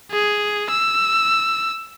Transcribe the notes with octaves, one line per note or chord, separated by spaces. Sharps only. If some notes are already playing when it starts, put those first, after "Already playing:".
G#4
E6